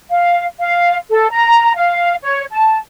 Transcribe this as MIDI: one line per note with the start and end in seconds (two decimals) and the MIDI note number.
0.10 0.45 77
0.60 0.97 77
1.10 1.29 69
1.31 1.72 82
1.76 2.15 77
2.22 2.43 73
2.51 2.77 81